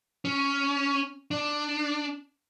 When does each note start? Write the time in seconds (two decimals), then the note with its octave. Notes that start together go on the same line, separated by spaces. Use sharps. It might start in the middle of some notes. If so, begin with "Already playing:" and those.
0.25 C#4
1.31 D4